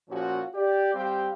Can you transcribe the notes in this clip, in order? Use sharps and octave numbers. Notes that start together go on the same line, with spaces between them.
A#2 F3 C#4 F4 F#4
G4 D5
G3 C4 G4 F5 G5